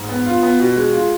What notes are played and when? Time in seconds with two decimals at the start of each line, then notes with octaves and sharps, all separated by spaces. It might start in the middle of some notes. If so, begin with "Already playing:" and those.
Already playing: G#2
0.09 B3
0.26 F4
0.43 B3
0.59 B2
0.76 G#3
0.93 F4